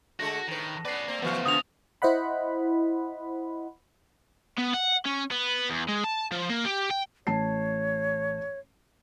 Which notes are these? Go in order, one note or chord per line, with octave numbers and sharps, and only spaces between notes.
D3 G#3 A3 F#4 A#6
A2 D#3 B4
B3 C#4 B4 D5 C7
A#3 C4
C#3 E3 F3 A3 B3 C5 F5
E2 C#3 F4 F#4 D#6 F7
E4 C5 D#5 F#5 B5
B3
F#5
C#4
B3
E2
G#3
A5
F3
A#3
G4
G5
A1 C#5 A5 C7